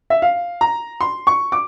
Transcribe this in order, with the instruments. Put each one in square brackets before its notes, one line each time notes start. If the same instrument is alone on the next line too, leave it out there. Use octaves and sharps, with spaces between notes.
[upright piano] E5
F5
A#5
C6
C#6
D6